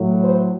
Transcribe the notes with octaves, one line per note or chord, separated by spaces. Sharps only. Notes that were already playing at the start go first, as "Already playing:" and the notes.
Already playing: A2 F#3
C5